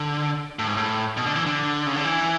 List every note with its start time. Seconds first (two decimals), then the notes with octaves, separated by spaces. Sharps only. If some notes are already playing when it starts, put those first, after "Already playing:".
Already playing: D3
0.59 A2
0.67 G#2
0.77 A2
1.17 B2
1.26 D3
1.35 E3
1.46 D3
1.87 C#3
1.96 D3
2.05 E3